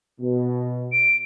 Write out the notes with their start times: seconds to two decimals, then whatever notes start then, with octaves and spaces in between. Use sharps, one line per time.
0.20 B2
0.92 D7